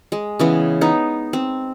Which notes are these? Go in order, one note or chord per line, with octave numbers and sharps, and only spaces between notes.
G#3
C#3 E3 B3
B3 D#4
C4